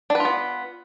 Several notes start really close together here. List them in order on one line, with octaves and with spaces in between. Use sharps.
D4 B4 F4 B3